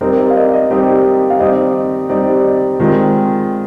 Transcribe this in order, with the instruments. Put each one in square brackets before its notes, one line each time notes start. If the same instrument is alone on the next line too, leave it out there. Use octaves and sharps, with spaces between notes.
[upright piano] G3 C4 D#4 G4 [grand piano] A#4
[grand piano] D5
F5
D#5
D#5
[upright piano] G3 C4 D#4 G4
[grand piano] F5
[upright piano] G3 C4 D#4 G4 [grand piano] D#5
[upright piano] G3 C4 D#4 G4 [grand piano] D5
[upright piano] D#3 G#3 C4 [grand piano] F4